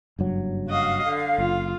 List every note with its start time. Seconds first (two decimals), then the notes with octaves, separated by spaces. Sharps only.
0.19 F#1 G2 F#3
0.69 F#4 D#5 F5
1.07 D3
1.38 F#1 F4